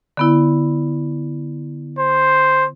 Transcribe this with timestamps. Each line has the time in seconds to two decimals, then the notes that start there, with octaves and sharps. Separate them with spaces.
0.17 D3 B3 E4
1.99 C5